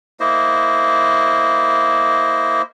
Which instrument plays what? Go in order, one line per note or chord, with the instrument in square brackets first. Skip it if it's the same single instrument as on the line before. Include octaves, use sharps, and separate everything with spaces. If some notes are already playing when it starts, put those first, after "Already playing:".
[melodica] A#3 E4 C5 D#5